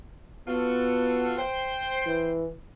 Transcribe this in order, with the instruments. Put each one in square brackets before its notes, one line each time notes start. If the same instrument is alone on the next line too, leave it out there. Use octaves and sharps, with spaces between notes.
[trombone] B3 [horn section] F4 F#4 A4
[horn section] C5 G5
[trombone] E3